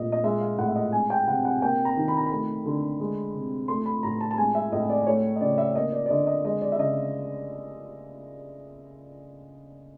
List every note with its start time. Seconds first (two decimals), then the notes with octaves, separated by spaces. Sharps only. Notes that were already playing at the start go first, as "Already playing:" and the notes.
Already playing: A#2 A3 D#5
0.12 D#5
0.24 G#3 E5
0.41 F5
0.58 A2 F#5
0.68 E5
0.76 D#5
0.92 G#3 G#5
1.10 G5
1.27 C3 F#5
1.45 F#5
1.62 A#3 G5
1.85 A#5
1.97 D#3
2.08 B5
2.17 A#5
2.26 A3 B5
2.66 D3
3.00 G#3
3.34 C3
3.68 A3 C6
3.86 B5
4.03 A2 A#5
4.21 A5
4.31 A5
4.37 G#3 G#5
4.55 E5
4.72 A2 D#5
4.90 D5
5.07 A3 C#5
5.36 D#5
5.41 C#3 D5
5.58 E5
5.75 A#3 D#5
5.92 D5
6.06 D5
6.10 D3 D#5
6.27 D#5
6.44 G#3 D#5
6.62 D5
6.72 E5
6.79 C#3 D#5